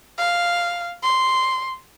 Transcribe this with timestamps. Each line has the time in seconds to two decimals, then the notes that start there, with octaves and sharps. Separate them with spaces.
0.19 F5
1.03 C6